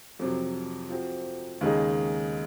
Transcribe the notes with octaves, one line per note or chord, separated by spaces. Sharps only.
F2 C3 F#3
F3 C4 F#4
D#2 C#3 G#3 D#4 G#4